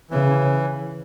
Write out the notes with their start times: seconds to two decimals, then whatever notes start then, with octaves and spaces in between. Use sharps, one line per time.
0.11 C#3 E3